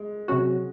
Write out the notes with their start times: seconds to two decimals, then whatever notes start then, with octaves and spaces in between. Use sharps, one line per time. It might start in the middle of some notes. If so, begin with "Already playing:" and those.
Already playing: G#3
0.28 C3 F#3 C#4 F#4